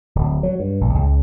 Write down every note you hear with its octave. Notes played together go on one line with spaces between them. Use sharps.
D1
F#3
G2
A#1
C#2